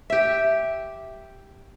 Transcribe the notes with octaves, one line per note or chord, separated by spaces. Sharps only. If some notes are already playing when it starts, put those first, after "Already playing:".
G4 E5